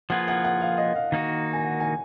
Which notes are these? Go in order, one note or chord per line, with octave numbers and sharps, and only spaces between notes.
F3 A#3 F4 G#4 B4 F#5
F#5
F#5
F5
D#5
F5
D#3 A#3 D#4 F#4
G#5
F#5
G#5